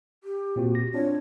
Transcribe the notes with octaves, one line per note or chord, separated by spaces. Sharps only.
G4
A#2 C4 F#4
A#6
C4 D4 F4 C#5